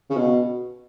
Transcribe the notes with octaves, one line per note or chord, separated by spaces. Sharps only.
C#3
B2